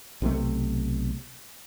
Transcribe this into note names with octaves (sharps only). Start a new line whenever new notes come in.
B1 C3 D#3 A3